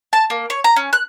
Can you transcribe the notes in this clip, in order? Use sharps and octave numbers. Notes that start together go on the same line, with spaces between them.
A5
A#3
C#5
A#5
C#4
F#6